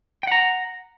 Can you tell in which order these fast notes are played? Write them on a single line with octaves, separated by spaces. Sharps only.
G5 F#5 A#5